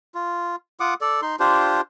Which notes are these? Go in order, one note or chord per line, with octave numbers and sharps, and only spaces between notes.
F4
F4 F#5 D6 D#6
A4 D5
D#4 C6
D4 F4 G4 C5